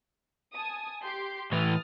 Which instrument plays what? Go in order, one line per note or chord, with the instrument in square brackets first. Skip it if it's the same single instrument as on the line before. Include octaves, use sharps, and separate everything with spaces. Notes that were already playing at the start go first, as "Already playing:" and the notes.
[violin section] G#5 A5 D#6
G4 C6 G6
[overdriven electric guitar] A2 E3 [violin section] D#6 F6 A6